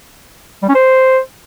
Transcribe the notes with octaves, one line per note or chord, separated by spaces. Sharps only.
G3
C#4
C5